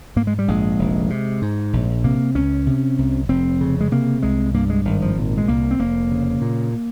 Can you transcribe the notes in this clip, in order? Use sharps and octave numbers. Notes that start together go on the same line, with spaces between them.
G#2 A#3
G#3
G3
A#1 G#3
F1
C3
G#2
A#1
C3 A#3
C#2 C#4
C3
C2
F1 C4
C#3
G#3
C3 A#3
C2 G#3
G2 A#3
G#3
G#1 D#3
F3
A#2
G#3
C2 A#3
C4
F1 A#3
C#3
A#2